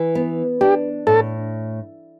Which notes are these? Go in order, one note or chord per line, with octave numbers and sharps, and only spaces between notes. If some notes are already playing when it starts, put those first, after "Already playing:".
Already playing: E3
B3
D4 G4
A2 A4